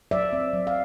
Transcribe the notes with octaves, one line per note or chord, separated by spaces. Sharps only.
F#3 D5 E5
C4
F#3
F5